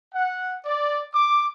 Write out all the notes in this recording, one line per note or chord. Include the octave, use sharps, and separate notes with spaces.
F#5
D5
D6